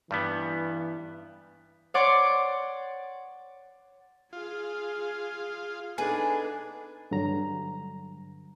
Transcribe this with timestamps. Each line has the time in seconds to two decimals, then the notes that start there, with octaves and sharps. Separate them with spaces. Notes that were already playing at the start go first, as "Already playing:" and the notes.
0.11 G2 E3 G3 B3
1.94 C#5 D5 F#5 C6 D6
4.33 F4 G#4
5.98 B3 D4 D#4 G#4 A4 B4
7.11 G2 D3 F#3 A#5